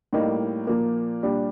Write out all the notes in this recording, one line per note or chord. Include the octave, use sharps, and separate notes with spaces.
A2 G3 A#3 D#4
A#2 F3 A#3
A#2 G3 D4 G4